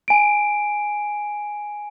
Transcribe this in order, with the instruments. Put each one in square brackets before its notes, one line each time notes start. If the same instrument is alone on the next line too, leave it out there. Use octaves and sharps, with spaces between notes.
[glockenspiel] G#5 D7